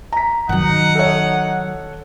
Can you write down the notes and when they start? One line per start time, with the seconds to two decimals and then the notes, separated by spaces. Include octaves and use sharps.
0.12 A#5 B6
0.49 D#3 F#3 D#4 F#5
0.95 A4 C#5